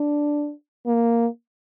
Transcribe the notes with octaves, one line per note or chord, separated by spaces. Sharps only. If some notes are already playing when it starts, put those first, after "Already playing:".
Already playing: D4
A#3